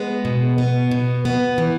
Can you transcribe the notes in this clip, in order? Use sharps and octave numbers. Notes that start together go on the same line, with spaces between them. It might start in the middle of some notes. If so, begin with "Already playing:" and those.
Already playing: G#3 B3
B2
B3
B2
B3
E3